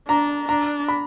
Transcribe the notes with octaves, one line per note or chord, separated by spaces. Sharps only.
D4 A#5
D4 A#5
B5